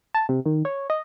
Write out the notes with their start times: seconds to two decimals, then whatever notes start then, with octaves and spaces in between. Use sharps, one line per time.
0.15 A5
0.29 C3
0.46 D#3
0.65 C#5
0.90 D#5